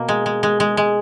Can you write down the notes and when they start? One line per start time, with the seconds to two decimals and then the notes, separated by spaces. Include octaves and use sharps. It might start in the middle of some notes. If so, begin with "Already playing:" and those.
Already playing: B2 A#3
0.09 G#3
0.26 G#3
0.43 G#3
0.60 G#3
0.77 G#3